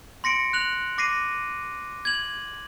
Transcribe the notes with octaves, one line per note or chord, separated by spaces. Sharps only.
C6 A#6 C#7 D7
F#6 F7 F#7
D6 A#6 C7 D#7
G#6 F#7